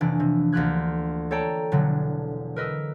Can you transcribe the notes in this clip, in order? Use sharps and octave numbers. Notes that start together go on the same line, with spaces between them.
F1 E3 D4
C3
D2 A#3 F4 G4 F#6 G#6
A4 C#5 D5 G5 A5 A#5
E1 D3 F#3
A#4 B4 D#5 E6